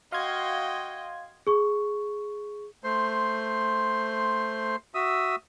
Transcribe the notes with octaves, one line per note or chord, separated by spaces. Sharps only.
F#4 D#5 F5 G5 C6 G#6
G#4 C#6
A3 C5 C6
F#4 E5 D#6 E6